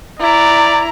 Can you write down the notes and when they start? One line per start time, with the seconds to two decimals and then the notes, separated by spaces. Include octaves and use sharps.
0.20 E4 D5 A#5